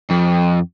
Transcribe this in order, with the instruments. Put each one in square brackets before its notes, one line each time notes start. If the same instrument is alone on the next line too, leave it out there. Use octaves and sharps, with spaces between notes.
[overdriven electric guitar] F2